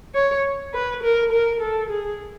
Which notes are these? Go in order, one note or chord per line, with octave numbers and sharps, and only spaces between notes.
C#5
B4
A#4
A#4
A4
G#4